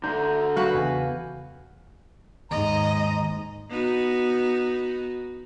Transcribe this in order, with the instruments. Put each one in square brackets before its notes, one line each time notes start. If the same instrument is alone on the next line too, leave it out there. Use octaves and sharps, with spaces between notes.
[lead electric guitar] D3 A3 [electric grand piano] A#5 G6
[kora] F#4 B4 [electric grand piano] F5
[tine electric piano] E2 C#3 G#5
[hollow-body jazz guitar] D#2 [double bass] G#2 [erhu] D#5 [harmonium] A#5
[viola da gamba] B3 D#4 F#4